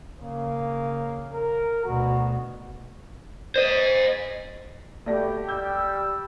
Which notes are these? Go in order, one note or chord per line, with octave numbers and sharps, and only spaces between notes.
C#3 A#3
A#4
D2 B2 F#4
C5 D#5
B2 A3 G4 D5 A#6
G3 E6 G6